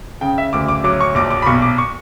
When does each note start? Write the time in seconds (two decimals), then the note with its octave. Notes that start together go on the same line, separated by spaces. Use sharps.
0.21 C#3 G5
0.38 E5
0.53 D2 D6
0.68 D6
0.84 F#3 D6
1.01 C#6
1.15 A#1 D6
1.31 D6
1.42 B5
1.46 B1 C#6
1.62 D6
1.78 C#6